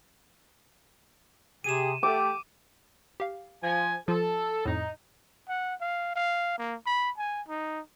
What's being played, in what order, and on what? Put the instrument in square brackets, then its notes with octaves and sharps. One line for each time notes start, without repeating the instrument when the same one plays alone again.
[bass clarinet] C3 [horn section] G4 G#4 [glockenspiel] D#7 E7
[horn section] A3 [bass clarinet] G4 [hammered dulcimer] D6
[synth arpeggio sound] G4 F5
[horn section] F3 G#5
[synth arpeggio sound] F3 F4 [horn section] A4
[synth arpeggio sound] F2 A2 [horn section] D#4
[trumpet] F#5
F5
F5
A#3
B5
G#5
D#4